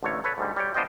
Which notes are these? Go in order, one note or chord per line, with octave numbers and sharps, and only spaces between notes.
A1 D3 A3 A#3 C#5
A4 B4 C#5
D2 G#2 G3
G3 C#5 G5
B3 D4 F4 C5 D#5 G5